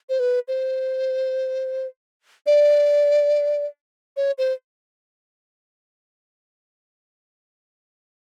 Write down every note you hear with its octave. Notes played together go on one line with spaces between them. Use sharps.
C5
B4
C5
D5
C#5
C5